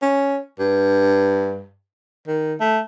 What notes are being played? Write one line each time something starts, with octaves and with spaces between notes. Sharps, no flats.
C#4
G2
D#3
A3